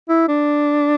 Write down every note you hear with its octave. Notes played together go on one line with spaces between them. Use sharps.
E4
D4